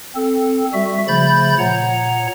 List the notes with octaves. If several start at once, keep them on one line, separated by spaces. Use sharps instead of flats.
C4 A4
G3 F#4 E5
C#3 F3 A3 B5 G6 A6
A#2 C#5 F#5 A#5